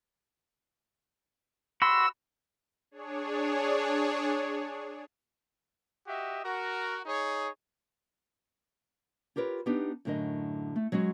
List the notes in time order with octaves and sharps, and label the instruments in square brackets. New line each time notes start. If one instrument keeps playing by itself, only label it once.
[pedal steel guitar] F#4 B5 C6 [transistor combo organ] E6
[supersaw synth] D4 G#4 C#5
[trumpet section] F#4 G4 D#5 E5
F#4 A#4
D#4 G#4 C#5
[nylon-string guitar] F4 G4 A#4 B4 C#5
B3 D4 D#4 G4
F#2 A2 D3 A#4 D#5
A3
F#3 G#3 C#4 F#4